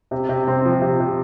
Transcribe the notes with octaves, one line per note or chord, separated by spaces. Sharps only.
C3
C3
C4
F3
C3
C3